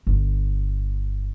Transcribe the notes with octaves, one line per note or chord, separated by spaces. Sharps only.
G1